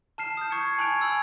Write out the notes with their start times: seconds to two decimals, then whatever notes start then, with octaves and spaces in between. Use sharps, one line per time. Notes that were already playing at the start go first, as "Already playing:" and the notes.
0.18 A5 F6 C7 E7
0.37 D#6 G6
0.51 A5 C#6 G#6 C7 C#7
0.78 G#5 B5 F#6 G#6 D7 F7
1.00 G#5 B5 E6 G#6